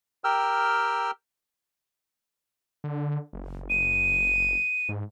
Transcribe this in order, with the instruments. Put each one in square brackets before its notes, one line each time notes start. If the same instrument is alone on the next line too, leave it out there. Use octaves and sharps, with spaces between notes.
[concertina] G4 A#4 G5 E6 F6
[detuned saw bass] D3
F#1
[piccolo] D#7
[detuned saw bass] G#2